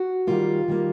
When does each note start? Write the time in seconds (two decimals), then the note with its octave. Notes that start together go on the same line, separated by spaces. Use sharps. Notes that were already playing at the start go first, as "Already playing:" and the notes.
Already playing: F#4
0.27 D#3 G3 A#3 F4
0.68 D#3 G3 A#3